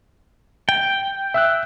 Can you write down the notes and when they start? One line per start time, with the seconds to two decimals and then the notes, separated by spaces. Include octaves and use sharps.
0.69 G5
1.34 E5 E6 F#6